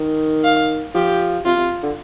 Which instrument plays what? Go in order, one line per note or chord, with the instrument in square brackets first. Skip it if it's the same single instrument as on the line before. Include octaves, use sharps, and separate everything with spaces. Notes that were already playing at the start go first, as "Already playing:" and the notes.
Already playing: [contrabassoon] D#3
[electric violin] F5
[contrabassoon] F3 [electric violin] G4
[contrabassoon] C3 [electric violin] F4
[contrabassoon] C3
D3